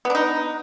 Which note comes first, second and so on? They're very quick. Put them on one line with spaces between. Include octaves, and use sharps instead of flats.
B3 D4 D#4